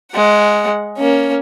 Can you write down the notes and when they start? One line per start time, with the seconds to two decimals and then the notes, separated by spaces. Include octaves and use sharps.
0.13 G#3 F#5
0.98 A#3 C#4